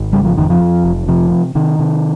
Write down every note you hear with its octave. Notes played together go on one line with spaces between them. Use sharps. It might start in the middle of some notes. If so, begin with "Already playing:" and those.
Already playing: G#1
C#3 G3
F3
F2 D#3
F3
F2
F1
C3 F3
C3
C3 D#3
C3